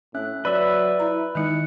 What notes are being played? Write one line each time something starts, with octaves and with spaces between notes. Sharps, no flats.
A2 C#4 E5 F#6
F#3 B4 D5 E5 E6
E4 A#5
D#3 G#3 D#4 E4 F#6 C#7